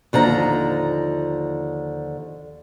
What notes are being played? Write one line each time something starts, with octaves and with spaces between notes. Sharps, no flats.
D#2 D3 F3 A#5